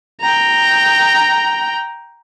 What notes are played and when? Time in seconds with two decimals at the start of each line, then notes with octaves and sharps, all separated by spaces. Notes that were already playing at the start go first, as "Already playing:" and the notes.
0.21 G5 A#5